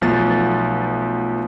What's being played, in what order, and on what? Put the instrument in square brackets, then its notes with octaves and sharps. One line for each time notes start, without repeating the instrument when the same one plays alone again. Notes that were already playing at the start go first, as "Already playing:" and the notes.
[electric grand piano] B1 F3 A3 B3 A6